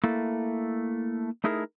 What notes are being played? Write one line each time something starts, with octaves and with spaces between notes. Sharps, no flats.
A3 A#3 E4 A4
A3 D#4 E4 G#4 A#4